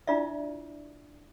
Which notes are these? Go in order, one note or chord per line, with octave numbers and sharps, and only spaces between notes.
D4 E4 F4 D5 E5